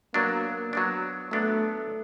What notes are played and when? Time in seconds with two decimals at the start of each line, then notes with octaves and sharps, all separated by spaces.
0.14 F#3 A#3 B3 D4
0.73 F#3 B3 D4
1.31 F#3 A3 B3 D4